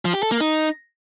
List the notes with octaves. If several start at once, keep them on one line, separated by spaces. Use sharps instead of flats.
F3
G4
A4
A#3
D#4